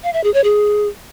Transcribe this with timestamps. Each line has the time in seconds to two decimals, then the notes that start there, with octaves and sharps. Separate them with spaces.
0.03 F5
0.14 E5
0.24 G#4
0.34 C#5
0.44 G#4